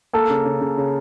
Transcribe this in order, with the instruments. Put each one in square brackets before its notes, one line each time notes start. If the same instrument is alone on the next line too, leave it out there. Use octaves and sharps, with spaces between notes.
[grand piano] A#3 [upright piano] A4
[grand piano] C#3
C#3
C#3
C#3